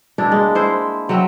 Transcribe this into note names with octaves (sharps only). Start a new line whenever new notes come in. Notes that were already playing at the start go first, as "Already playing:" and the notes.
B2 D4 E4
G#3 A#3
E4 C5
F#3 C4 E5 G5